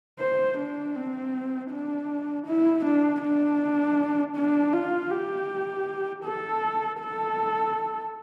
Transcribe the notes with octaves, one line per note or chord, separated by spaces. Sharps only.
C5
D4
C4
D4
E4
D4
D4
D4
F4
G4
A4
A4